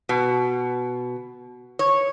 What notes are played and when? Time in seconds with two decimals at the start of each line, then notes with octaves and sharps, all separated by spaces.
0.09 B2
1.79 C#5